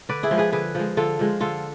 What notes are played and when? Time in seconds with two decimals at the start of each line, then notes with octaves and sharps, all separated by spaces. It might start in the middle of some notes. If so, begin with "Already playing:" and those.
0.09 D3 B4 D5
0.23 E4 G#4
0.31 F3 G#3
0.38 G#4 B4
0.52 D3 G#4 B4
0.75 F3 G#3
0.97 D3 F4 A4
1.19 F3 G#3
1.40 D3 F4 A4